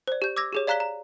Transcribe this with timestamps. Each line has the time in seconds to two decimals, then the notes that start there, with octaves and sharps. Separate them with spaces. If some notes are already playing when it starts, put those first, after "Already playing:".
0.08 C5 D5
0.22 G4 G6
0.36 D6 E6 G#6 A#6
0.53 G4 G#4 C#5
0.67 D5 F5 A#5 F#6 B6 G7
0.80 A#5